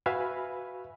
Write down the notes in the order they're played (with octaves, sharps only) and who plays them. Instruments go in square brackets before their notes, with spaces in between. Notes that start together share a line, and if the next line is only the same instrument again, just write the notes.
[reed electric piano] F#4 B4 E5 F5 G#5 B5